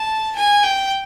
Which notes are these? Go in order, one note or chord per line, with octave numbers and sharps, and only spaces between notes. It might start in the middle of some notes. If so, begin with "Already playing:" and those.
Already playing: A5
G#5
G5